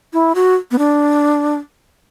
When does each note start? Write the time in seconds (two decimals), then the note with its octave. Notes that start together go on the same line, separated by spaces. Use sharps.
0.13 E4
0.35 F#4
0.71 B3
0.78 D4